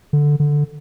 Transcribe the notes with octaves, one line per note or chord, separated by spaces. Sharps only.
D3
D3